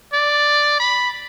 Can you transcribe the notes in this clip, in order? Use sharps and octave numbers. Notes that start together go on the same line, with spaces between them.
D5
B5